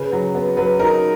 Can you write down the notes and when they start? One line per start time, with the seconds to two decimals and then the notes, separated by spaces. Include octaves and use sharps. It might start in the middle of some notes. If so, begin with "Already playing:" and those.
Already playing: C#3 B4
0.12 F#3
0.35 B3
0.57 F#3 B4
0.79 D#4 A#4